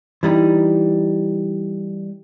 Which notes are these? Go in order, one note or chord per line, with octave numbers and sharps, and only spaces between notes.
E3 G3 D#4